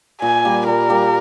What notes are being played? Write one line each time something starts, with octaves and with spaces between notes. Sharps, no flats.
A#2 G#5
G3 A#3
A#2 A#4
G3 A#3